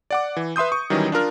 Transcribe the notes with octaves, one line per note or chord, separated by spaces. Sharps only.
D5 F#5 D6
E3
B4 E5 C6 D#6 G6
C#6
D#3 E3 F#3 G3 C#4 D#5
D4 F4 A#4 F6